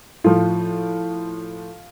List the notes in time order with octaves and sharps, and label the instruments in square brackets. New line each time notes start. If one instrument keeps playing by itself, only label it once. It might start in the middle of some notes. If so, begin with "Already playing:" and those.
[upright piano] A2 F3 F4